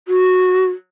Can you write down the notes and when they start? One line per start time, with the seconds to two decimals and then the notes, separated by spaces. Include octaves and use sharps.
0.08 F#4